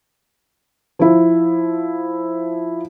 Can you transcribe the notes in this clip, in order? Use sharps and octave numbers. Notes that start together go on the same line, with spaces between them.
F3 E4